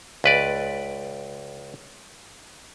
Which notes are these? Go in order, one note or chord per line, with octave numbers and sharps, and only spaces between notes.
C#2 B4 D5